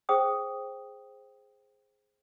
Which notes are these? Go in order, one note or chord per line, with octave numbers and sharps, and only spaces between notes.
G#4 C5 G5 D#6